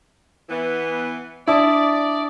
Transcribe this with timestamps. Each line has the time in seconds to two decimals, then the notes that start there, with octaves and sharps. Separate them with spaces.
0.49 E3 B3
1.47 D4 E4 D5 A5 D#6